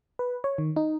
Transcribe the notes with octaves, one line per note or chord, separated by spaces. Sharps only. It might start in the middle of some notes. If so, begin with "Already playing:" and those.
B4
C#5
D#3
D#4